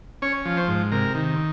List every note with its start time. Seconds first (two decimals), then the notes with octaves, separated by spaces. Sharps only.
0.22 C#4 C#5
0.45 F3
0.57 C5
0.68 G#2
0.92 C3 A#4
1.15 D#3